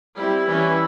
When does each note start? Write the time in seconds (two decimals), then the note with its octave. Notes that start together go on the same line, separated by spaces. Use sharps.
0.17 G3 C4 E4
0.48 E3 G3 C#4